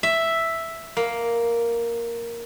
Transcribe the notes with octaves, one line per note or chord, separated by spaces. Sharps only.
E5
A#3